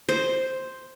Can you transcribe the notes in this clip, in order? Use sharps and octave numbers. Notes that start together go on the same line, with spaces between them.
C5